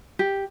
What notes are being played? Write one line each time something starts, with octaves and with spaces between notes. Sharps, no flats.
G4